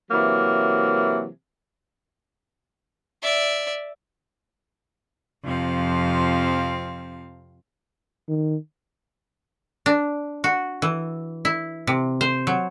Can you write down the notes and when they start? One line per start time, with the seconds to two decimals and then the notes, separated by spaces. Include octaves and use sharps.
0.11 C3 E3 F#3 A#3
3.23 D5 E5
5.43 F2 C3 F3 C4 F5
8.28 D#3
9.86 D4
10.44 F#4
10.82 E3
11.45 E4
11.87 C3
12.21 C5
12.47 F#3